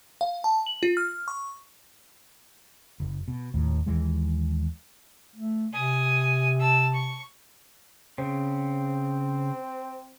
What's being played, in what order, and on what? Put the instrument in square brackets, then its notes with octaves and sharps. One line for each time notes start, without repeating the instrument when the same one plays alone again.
[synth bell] F5
A5
F#7
F4
F6
C#6
[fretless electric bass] F#1
B2
D#1 D#2 A2
D#2 E3 G#3
[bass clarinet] A3
[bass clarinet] C3 [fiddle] G#5 D#6
[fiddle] A5 E6
C#6
[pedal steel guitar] C#3 [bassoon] C4